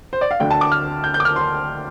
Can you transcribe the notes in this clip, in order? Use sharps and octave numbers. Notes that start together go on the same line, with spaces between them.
C5
D5
F5
D2 D3 A3 D4 G5
A5
D6
F6
G6
G6
D6
F6
C6